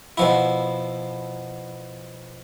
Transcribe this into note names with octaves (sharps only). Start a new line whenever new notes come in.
B2 F3 E4